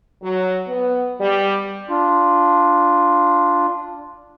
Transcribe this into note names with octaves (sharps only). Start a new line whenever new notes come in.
F#3
B3
G3
D4 F4